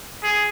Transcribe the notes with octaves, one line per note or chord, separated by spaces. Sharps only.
G#4